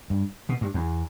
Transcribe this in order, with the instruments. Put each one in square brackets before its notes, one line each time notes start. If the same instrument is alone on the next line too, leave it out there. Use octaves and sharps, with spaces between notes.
[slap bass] G2
B2
G2
E2